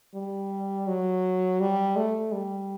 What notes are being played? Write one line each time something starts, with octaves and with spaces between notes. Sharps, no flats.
G3
F#3
G3
A3
G3